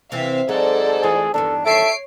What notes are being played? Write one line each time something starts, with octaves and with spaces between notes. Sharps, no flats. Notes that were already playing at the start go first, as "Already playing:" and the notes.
C3 E3 C4 E5 F5
G#2 F#3 A4 C5 D5
E3 A3 F4 G#4
E2 G2 D#3 D4 A4
A4 C#5 E5 C7 D7